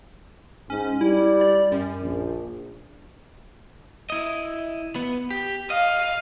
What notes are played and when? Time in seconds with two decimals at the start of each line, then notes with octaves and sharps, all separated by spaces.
0.70 G#2 C#4
1.01 G3 E4
1.41 D5
1.72 F#2
2.02 A#1
4.10 E4 D#5
4.96 B3
5.31 G4
5.70 D#5 F5